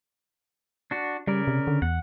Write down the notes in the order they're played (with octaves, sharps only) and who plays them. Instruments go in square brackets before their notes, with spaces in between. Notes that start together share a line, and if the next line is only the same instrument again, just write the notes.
[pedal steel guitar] D4 F#4
[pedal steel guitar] C#3 A#4 D5 [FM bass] G3
[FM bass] C3
D3
[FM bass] E2 [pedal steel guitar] F#5